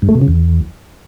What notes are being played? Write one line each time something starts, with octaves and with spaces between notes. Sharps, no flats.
G2
A3
B2
C#3
E2